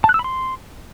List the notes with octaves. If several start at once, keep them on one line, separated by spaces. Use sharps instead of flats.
A5
F#6
E6
B5
C6